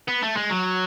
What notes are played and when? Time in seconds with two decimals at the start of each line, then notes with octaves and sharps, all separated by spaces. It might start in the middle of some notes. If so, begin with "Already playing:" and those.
0.08 B3
0.22 A3
0.36 G#3
0.50 F#3